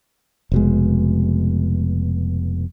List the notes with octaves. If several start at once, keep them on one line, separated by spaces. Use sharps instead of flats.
F1 B2 G#3